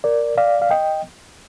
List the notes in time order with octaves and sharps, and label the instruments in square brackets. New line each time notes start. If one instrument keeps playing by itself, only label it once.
[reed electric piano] A#4 D5
D5 F5
F5
D#5 G5